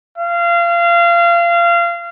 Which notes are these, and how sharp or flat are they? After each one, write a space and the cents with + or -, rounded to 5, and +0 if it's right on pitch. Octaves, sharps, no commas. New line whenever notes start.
F5 -25